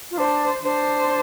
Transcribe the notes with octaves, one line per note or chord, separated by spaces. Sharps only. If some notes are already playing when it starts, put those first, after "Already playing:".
F4
D4 C5
D4 C5